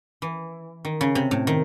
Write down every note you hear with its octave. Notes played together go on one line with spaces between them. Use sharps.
E3
D#3
C#3
C3
A2
D#3